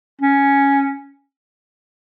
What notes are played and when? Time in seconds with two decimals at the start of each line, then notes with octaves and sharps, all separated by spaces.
0.22 C#4